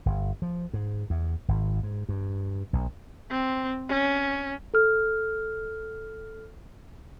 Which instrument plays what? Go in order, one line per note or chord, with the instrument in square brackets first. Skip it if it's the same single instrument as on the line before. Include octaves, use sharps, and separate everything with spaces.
[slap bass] G1
F3
G#2
E2
G#1
G#2
G2
B1
[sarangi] C4
C#4
[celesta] A4 F6